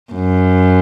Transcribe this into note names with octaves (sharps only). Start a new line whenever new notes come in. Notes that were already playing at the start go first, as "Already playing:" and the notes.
F#2